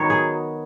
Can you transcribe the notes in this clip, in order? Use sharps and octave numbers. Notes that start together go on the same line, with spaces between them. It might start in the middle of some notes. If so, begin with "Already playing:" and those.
Already playing: D#3 F#3 B3 C#5
G#4